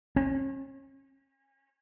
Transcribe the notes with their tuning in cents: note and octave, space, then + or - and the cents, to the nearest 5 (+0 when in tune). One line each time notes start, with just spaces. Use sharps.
C#4 -35